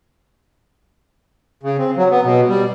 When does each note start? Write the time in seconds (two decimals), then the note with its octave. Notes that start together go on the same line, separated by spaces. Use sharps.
1.63 C#3
1.78 C4
1.97 F#3
2.11 B3
2.24 B2
2.49 G3